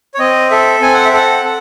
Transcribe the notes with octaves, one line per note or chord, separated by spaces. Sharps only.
C#5
C4 D#5
A4 E5
C4 G#5
F#5
E5
A4 F#5
A4